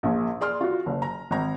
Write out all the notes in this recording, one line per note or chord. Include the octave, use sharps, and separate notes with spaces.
A#1 A#2
G#4 D5 C6 F6
F4 F#4
F#1
A#5
G#1 A#5